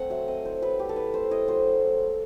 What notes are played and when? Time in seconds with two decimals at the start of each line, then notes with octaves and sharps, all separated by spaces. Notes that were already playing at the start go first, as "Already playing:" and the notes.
Already playing: A3 C4 C5 F#5
0.10 F#3 E5
0.28 C4 D#5
0.45 E4 C5
0.62 F#3 B4
0.79 A3 G4
0.89 A4
0.96 E4 B4
1.14 A3 C5
1.31 E4 D#5
1.48 F#3 C5